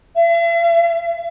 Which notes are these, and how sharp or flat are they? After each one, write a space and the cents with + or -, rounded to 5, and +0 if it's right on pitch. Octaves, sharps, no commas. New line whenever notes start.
E5 +45